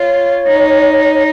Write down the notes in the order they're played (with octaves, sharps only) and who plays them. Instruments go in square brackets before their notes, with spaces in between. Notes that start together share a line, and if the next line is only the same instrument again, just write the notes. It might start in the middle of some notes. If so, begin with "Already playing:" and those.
Already playing: [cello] F4 [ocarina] C#5
[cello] D#4